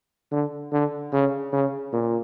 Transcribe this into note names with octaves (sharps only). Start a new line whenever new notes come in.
D3
D3
C#3
C#3
A#2